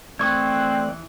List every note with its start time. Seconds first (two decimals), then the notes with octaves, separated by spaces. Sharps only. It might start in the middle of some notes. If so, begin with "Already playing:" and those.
0.19 E3 A3 C4 D5 C#6 D#6 F#6 G#6